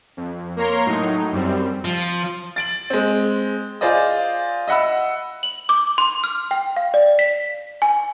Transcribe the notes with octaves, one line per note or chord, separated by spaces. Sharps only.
F2
A#3 A#4 C#5 A#5 C6
A2 F#3 D#4
F#2 G3 C4
F3
A6 D7 F#7
G#3 C4
F4 G#4 C5 D5 D#5
D#5 E5 F#5 B5 E6
F#7
D6
C6
F6
G5
F5
D5
B6
G#5